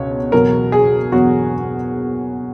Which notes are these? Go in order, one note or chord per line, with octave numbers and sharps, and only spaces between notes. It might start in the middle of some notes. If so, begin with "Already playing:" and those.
Already playing: C#2 B2 C#5
E2 B2 F#3 A#4
G#4
E2 B2 F#3 F#4